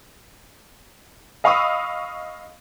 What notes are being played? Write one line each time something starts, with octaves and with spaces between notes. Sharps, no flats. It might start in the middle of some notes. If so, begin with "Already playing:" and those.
D#5 F5 B5 C#6 D#6 E6